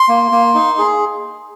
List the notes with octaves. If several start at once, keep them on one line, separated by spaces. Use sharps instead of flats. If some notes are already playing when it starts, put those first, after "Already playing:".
Already playing: C6
A#3
A#3
D#4
G#4